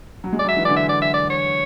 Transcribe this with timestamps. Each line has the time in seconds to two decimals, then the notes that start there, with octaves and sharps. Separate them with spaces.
0.24 F#3
0.32 G#3
0.39 D5
0.45 F#3
0.49 E5
0.56 E3
0.65 D3 D5
0.76 E5
0.89 D5
1.02 E5
1.14 D5
1.30 C#5